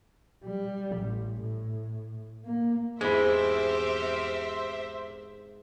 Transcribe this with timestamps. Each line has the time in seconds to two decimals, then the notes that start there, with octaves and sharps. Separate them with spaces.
0.45 G3
0.97 A1
1.41 A2
2.45 A#3
3.01 E2 G#2 G#3 C4 E4 G4 C5 E5